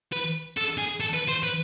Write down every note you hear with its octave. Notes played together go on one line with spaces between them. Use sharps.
B4
A4
G#4
A4
B4
C5
B4